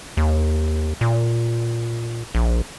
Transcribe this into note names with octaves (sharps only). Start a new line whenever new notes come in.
D#2
A#2
A#1